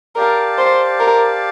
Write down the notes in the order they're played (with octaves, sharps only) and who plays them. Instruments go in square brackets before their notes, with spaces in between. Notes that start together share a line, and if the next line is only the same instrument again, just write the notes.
[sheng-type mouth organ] G4 D5 F5 A5 [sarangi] A#4
[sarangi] C5
A#4